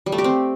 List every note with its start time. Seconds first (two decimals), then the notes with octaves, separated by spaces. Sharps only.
0.06 G3
0.12 A3
0.18 G4
0.24 C4